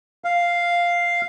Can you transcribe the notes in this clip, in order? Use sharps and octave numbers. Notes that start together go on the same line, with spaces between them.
F5